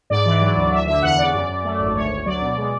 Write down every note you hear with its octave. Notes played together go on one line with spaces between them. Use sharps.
G#2 D5
E3
F#3
D2
D2 E5
D3 E5
E2 F#5
C#3 D5
F#2
F#2
A3
G#1
D2 C#5
D2
F#3 D5
B2
G#3